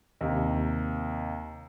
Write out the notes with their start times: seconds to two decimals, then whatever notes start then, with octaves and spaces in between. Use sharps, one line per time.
0.21 D#2 C3